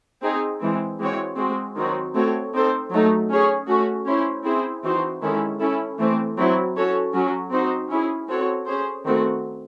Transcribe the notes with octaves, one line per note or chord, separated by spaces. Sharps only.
C4 D#4 G#4
E3 G#3 C4
E3 G#3 C4 F#4 C#5
G#3 C4 F#4
D#3 F#3 C4 D#4 F#4
A3 C4 F#4 A4 C#5
C4 D#4 A4 C5
F#3 A3 D#4
C#4 G#4 C#5
A3 C#4 F#4
C#4 E4 C5
C4 E4 G#4 C5
E3 C4 D#4 F#4 C5
D#3 G#3 C#4 E4 A4
C#4 E4 A4
E3 A3 C4
F#3 C4 E4
C#4 F#4 A4 C#5
F#3 C#4 F#4
C4 D#4 F#4 C5
C#4 E4 G#4
C4 F#4 A4 C#5
C#4 G#4 C5
D#3 A3 C4 F#4